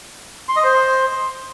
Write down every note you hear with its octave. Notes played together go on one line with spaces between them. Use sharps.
C6
D#5
C5